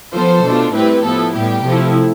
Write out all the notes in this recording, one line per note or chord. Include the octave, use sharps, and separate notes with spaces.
F3 B3 F4 A4 C5
B2 A3 D4 F4
A2 G3 C4 E4 G4 B4
F3 B3 E4 A4
A2 G3 B3 G4
C3 F3 A3 E4